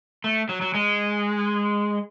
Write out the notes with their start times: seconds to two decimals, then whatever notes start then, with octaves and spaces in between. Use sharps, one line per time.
0.24 A3
0.49 F#3
0.62 F#3
0.74 G#3